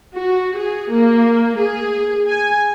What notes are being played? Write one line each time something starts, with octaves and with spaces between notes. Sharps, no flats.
F#4
G#4
A#3
G#4
G#5